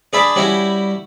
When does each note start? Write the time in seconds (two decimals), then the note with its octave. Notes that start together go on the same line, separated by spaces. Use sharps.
0.13 D4 G#4 D5 E5 A5 B5
0.36 G3 C#4 E4 F#4